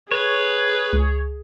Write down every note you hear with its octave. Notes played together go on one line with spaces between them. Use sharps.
G#4 B4 C#5
C#2